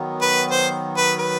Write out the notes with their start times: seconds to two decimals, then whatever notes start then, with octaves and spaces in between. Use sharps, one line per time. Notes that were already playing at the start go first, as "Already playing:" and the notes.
Already playing: D#3 F#3 B3
0.21 B4
0.51 C5
0.97 B4
1.20 B4